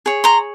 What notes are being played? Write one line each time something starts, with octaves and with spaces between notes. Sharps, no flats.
G#4 C#5
A#5 C6